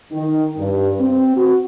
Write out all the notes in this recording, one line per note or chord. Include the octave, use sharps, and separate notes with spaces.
D#3
G2
C4
F#4